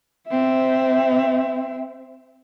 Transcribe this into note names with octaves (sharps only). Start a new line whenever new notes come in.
C4 E5